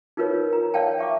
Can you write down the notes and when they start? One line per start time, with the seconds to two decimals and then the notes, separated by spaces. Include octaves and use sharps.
0.17 D#4 F4 A#4 B4 C#5
0.53 A#5
0.74 C#5 D5 F5 G5 A5
0.98 E5 C#6 D6